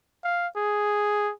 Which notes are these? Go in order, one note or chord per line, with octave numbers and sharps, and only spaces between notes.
F5
G#4